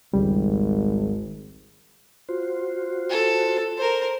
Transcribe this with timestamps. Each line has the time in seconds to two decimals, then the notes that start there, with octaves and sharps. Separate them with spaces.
0.14 G#1 C#2 G3
2.29 F4 F#4 C5
3.09 A4
3.77 A#4 C5